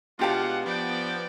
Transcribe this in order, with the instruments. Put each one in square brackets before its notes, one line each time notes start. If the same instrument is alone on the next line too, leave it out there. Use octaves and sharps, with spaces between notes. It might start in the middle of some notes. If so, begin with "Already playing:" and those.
[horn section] B2 G#3 F4 [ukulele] D4 G4 A5 [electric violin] F5 F#5
[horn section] F3 B3 [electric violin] D5 G5